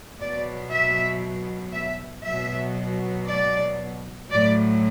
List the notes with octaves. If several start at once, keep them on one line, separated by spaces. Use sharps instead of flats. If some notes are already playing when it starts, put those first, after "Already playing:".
B2 F#3 D5
E5
E5
B2 F#3 E5
D5
A2 F#3 D5